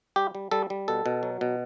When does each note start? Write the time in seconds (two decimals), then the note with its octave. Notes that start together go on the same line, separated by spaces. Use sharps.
0.16 G3 G4
0.35 G3
0.51 G3 A4
0.70 G3
0.88 B2 A4
1.06 B2
1.23 F#3
1.41 B2